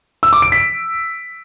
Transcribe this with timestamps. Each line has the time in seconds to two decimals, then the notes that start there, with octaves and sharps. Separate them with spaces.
0.23 E6
0.33 D6
0.42 D7
0.52 B6